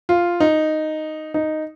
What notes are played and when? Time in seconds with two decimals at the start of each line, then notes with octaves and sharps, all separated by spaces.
0.09 F4
0.40 D#4
1.34 D#4